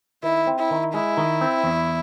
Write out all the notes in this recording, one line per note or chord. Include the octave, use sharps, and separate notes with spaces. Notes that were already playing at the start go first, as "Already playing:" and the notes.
D#3 E4
C4
E4
D#3
G#3 E4
D#3
C4
E2